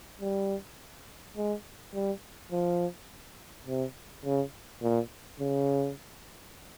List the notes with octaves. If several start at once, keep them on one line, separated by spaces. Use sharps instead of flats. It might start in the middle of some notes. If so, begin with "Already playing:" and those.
G3
G#3
G3
F3
C3
C#3
A#2
C#3